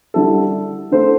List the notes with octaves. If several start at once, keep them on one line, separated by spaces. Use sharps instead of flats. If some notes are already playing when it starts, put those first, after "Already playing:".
D3 G3 E4 A4
D3 A3 C4 E4 C5